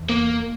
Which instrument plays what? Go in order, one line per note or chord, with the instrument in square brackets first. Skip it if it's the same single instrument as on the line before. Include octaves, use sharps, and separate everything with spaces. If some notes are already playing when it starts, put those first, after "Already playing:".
Already playing: [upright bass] E2
[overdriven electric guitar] A#3